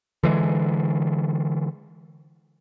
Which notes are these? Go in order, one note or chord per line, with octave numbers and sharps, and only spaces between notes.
D3 E3 G#3